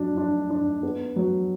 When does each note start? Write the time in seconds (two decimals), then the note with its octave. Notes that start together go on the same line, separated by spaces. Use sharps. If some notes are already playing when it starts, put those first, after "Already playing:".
Already playing: F#3 D4
0.17 D4
0.50 D4
0.83 B3
1.16 F#3